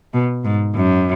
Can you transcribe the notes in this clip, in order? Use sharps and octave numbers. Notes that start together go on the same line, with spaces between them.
B2
G#2
F#2